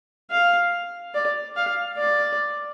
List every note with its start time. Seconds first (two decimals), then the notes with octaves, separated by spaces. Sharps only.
0.31 F5
1.14 D5
1.56 F5
1.98 D5